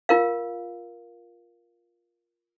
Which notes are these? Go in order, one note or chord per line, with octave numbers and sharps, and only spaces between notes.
F4 A#4 F5